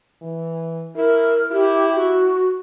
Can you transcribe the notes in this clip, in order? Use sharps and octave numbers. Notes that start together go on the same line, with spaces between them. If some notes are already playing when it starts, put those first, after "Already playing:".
E3
E4 A#4
E4 G4
F#4